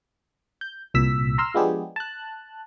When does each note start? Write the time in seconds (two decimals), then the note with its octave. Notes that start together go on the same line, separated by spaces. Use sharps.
0.61 G6
0.94 C2 A#2 E6 B6
1.38 A#5 C6 E6 F6
1.54 F3 G#3 B3 D4 G4 G#4
1.96 A5 F#6